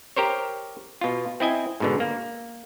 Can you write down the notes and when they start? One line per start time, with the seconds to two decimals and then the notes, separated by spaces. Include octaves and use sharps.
0.16 G4 A#4 C5 C#5
1.01 B2 F4
1.40 C4 E4 D#5 G#5
1.80 G#2 B2 D3
2.00 A#3